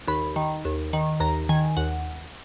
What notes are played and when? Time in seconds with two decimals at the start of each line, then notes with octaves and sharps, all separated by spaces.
0.08 D#2 B5
0.36 D#3
0.65 D#2
0.93 D#3
1.20 D#2 A#5
1.49 D#3 G#5
1.77 D#2 F#5